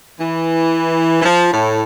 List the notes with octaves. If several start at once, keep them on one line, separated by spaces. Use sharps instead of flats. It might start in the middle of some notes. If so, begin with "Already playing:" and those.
E3
E3
F3
A2